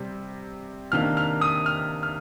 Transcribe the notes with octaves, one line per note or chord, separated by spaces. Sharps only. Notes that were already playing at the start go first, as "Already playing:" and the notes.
Already playing: C3 G3 C4
C3 D#3 A#3 D4 F6
F6
D#6
F6
F6